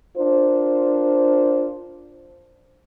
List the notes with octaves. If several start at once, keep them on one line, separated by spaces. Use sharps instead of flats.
D4 F4 A#4 C5